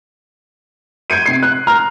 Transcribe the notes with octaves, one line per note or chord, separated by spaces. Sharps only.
G6 G#6 D7 D#7
C3 C7
F#6
A#5 F6